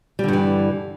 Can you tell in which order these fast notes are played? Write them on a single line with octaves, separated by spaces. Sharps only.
G3 D3 G2 E3